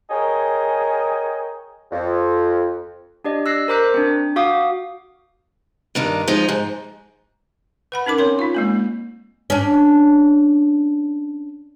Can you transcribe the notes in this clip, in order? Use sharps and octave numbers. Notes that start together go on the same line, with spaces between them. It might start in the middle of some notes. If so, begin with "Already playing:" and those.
G#4 A#4 C#5 D#5 G5 G#5
F2
D4 G4 D5 D#5
E6 F#6 A#6 C7
A#4 C5 A#5 D6 F#6 B6
C4 D4
F#4 F5 D6 D#6
G2 D#3 D4
F3 G#3 D#4
G#2
B4 F#5 B5
C#4 D#4 A#4 D6
C4 C#5 C6
D#4 F4
G#3 A#3 C4
C#4 D4